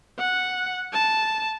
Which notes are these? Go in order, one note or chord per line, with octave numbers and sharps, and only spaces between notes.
F#5
A5